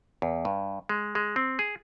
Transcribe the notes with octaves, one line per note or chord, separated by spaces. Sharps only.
E2
G2
G#3
G#3
C4
G#4